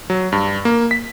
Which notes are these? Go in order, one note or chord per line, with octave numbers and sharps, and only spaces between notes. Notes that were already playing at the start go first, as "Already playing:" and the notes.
F#3
G2
A#3
B6